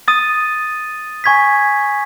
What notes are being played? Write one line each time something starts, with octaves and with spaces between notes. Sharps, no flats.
D#6 A6 D#7
G#5 C#6 G#6 B6